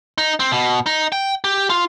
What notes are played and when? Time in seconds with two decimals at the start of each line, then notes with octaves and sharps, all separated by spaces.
0.18 D#4
0.40 C4
0.52 B2
0.86 D#4
1.12 G5
1.44 G4
1.70 F4